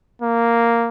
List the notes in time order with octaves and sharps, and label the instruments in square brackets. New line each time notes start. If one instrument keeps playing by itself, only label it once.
[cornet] A#3